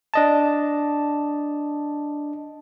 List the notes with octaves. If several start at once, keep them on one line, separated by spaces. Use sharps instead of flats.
D4 D#5 A5